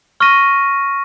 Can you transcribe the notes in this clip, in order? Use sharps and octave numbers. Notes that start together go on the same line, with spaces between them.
C#6 F6 A#6 D#7